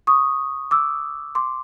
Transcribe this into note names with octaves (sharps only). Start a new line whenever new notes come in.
C#6 D#6
D6 E6
C6 D6